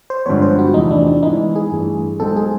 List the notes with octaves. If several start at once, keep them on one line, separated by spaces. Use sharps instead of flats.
C5
G2 D3 F3 G#3 B3 C#5
C5
F#4
E2 C3 F3 A3 D#4
D4
D4
G#2 E3 G#3 B3 D#4 E4
G#4
G2 E3 A3
B1 B2 G#3 C4 A4
G#4